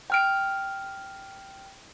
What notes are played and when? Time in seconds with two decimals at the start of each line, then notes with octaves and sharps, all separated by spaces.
0.10 G5 F6 D7